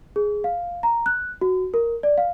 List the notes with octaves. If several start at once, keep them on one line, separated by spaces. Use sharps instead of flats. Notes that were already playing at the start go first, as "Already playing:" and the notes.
G#4
F5
A#5
F#6
F#4
A#4
D5
F5